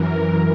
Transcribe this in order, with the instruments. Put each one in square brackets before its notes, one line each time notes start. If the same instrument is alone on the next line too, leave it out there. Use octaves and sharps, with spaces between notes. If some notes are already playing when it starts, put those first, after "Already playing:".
Already playing: [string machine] F#2 E3 A#4